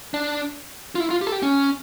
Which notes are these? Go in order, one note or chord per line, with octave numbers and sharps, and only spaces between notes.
D4
F4
E4
F4
G4
A4
G4
C#4